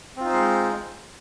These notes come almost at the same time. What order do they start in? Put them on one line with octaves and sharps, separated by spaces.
C4 F4 D#4 C5 G#3